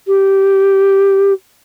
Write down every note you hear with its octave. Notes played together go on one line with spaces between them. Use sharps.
G4